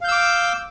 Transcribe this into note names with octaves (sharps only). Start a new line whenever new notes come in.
F5 D6 E6 G6